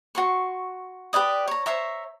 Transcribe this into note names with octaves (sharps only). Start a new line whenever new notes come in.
F#4 C6 C#6
G4 B4 D5 D#6
C#5 A#5
C5 C#5 E5 A#5